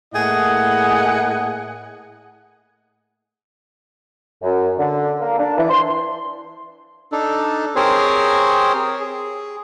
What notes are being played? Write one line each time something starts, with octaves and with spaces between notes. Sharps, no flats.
A2 A#3 E4 G#4 D#5 F#5
F#2
D3
A#3
D4
E3
C6
D4 D#4 A4
C4 G4 G#4 A#4 C5 C#5
G#4